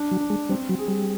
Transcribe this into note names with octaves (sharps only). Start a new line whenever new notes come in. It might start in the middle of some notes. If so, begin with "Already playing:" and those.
Already playing: D4
F#3
D4
G#3
G3 C4
F#3
G#4
G3